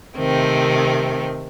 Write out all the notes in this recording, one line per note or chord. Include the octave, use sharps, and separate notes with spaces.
C3 D#3 A3 C4